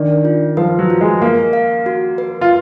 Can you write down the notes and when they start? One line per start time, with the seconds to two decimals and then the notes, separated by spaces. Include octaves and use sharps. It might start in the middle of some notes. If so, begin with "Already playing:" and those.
Already playing: D#3 D4 D5
0.25 F4
0.57 F3 B4
0.79 F#3
0.90 F4
1.01 G#3
1.22 A#3 F5
1.53 F5
1.86 F#4
2.18 B4
2.41 F4